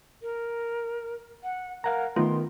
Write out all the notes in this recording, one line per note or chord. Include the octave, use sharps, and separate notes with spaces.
A#4
F#5
A#4 F5 F#5 A#5
D#3 A3 B3 F4 A#4 C6